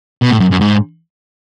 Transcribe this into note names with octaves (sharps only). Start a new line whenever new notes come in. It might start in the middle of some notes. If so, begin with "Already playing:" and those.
B2
A2
F#2
F#2
G#2